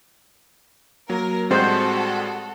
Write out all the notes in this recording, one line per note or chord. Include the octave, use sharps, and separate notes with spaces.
F#3 A#3 A#4
A2 G3 G#3 C4 F#4 A4 C5 F#5